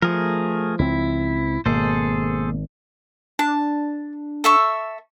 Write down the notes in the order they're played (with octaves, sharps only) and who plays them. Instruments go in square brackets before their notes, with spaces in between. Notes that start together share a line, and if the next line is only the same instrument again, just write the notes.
[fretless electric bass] F3 [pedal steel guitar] A3 G#4 A#4
[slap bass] C#2 C4 [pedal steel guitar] E4
[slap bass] G#1 [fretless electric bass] B2 A#3 [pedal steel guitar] G#4 A4 C5
[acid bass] D4 [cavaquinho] A5
[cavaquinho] A4 E5 C#6